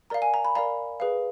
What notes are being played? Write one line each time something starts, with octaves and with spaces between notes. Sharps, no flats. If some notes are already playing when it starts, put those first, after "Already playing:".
A#4 D5 F5 A#5
G#5
A#5
B5
A#4 D5 F5 A#5
G#4 B4 F5